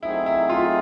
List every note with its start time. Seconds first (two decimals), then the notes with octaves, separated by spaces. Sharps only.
0.02 F#3 A3 C4 D#4 E4 G#4
0.26 E4
0.49 F4